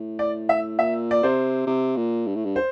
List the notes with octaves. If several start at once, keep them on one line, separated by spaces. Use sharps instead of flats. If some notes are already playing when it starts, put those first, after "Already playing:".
Already playing: A2
D5
E5
A#2 E5
D5
C3 C5
C3
A#2
G2
A2
G2
C5